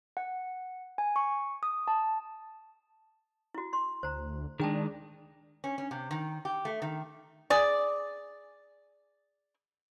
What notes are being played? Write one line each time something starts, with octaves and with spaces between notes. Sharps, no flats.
F#5
G#5
C#6
D#6
A5
E4 F#4
C6
D2 C5 A#5
D#3 G#3 D4 G#4 G5 A5
C#4
C#4
C3
D#3
G4
A3
D#3
G#4 D5